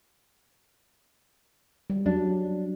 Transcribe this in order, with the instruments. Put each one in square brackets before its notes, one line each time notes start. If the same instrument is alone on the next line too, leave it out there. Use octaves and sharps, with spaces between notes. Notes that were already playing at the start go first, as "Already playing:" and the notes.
[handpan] G3
[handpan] F#3 [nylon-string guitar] D4